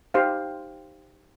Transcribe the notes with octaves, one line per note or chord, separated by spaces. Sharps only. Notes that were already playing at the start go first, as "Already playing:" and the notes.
D#4 G4 C5 F5